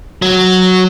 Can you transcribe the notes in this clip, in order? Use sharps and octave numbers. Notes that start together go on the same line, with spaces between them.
F#3